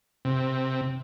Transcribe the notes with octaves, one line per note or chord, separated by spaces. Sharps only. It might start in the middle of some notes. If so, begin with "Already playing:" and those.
C3